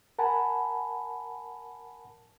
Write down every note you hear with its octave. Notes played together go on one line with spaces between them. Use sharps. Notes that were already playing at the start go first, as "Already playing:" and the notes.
A#4 F#5 G#5 A5 B5